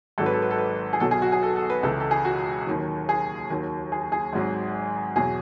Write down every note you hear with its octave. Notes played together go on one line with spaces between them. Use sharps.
G#1 G#2 F#3 A4
B4
A4
B4
A4
B4
G#4
B1 B2 F#3 A4
G#4
F#4
G#4
A4
A4
B4
C#2 C#3 E3 A4
A4
G#4
F#4
D#2 D#3 F#3
G#4
D#2 D#3 F#3
G#4
G#4
G#1 G#2 F#3
E2 B2 F#3 G#4